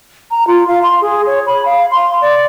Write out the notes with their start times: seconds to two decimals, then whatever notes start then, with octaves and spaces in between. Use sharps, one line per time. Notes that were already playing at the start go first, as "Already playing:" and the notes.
0.31 A#5
0.47 F4
0.68 F5
0.83 C6
1.01 G#4
1.26 C#5
1.47 B5
1.66 F5
1.91 C6
2.21 D5